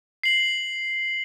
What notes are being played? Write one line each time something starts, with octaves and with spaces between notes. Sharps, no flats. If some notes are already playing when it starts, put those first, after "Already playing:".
C7 F#7